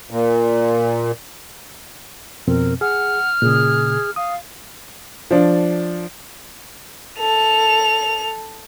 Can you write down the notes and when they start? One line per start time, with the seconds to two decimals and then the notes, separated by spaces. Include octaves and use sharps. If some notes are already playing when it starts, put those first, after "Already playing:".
0.11 A#2
2.48 F2 B2 C4 A#4
2.81 G#4 F#5 F6
3.42 A#2 C#3 G#4
4.16 F5 D#6
5.31 F3 D4
7.19 A4 F7